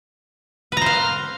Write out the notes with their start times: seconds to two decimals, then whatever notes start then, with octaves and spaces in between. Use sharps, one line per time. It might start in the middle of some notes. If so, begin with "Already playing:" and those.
0.72 B4
0.77 A#5
0.82 C5
0.86 F5